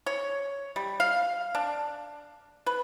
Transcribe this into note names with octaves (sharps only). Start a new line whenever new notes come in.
C#5
G3
F5
D4
B4